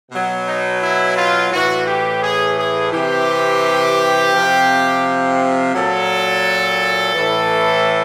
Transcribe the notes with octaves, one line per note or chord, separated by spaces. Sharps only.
B2 F#3
D#4
E4
F4
A2 E3 F#4
G4
G#4
G#4
C3 E3 G4
C3 F3
A#2 F#3 A4
A2 E3